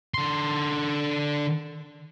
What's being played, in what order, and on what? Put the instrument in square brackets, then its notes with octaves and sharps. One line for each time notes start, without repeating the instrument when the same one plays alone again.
[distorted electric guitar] D3 C6